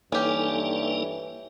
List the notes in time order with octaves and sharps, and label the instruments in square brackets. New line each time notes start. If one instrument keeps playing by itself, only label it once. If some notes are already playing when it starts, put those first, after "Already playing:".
[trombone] G2 [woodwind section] E3 [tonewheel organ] A#3 D#4 A4 [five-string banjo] C#4 G4